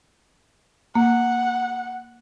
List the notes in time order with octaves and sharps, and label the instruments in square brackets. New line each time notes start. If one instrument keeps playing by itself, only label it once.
[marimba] A#3 [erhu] F#5